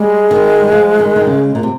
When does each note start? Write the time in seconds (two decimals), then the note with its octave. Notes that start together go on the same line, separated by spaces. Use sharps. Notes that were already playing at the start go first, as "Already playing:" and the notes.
Already playing: G3 G#3
0.31 D#3
0.61 G3
0.72 F3
1.00 D#3
1.16 D#3
1.27 C#3
1.55 A#2
1.63 C3